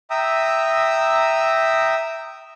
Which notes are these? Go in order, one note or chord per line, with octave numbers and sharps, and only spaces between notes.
E5 G5 A#5 D#6 E6